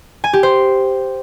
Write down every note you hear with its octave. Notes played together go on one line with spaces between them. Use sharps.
G#5
G4
C5